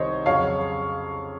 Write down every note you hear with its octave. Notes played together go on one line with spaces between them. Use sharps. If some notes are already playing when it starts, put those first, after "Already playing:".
Already playing: C2 C3 D#3 C5 C#5 D#5
F2 C#3 F#3 C#5 F5